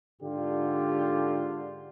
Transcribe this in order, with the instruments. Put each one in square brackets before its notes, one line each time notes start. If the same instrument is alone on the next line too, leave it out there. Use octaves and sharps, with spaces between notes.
[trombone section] G#2 D3 F4 G4